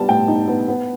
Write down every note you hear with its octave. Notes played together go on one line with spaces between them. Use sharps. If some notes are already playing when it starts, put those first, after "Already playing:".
Already playing: G3 B3 A5
A2 G5
D#4
B3
B3